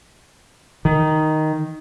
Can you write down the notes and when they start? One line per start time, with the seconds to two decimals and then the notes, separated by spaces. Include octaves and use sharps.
0.85 D#3